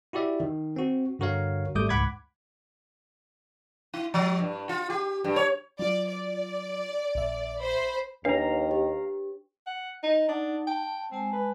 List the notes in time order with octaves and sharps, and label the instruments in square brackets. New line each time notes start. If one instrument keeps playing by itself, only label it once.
[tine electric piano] E4 F#4 G4 D5 E5
D#3
C4 F#4
G2 D3 F#4 A#4 C#5 F5
G#1 G3 A3 D6 D#6 G6
C#2 G#2 F#5 B5 D6 G#6
[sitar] E4
F3
G2
F4
G4
G2
C#5
[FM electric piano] F#3 F4 [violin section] D5
[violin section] D5
[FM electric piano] A#1 E5
[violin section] C5 B5
[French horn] D#2 [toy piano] D4 B4 C#5 [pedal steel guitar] F5 A#5
[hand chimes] G4
[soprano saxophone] F#5
D#4
[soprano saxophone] D4 [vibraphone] D#4 F#5
[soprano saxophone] G5 [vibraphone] A5
[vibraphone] G#3 G#5 A5 [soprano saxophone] C4
[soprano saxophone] B4